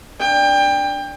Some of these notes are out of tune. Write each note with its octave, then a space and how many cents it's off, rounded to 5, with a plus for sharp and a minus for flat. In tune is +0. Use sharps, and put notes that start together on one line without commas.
D4 +0 G5 +25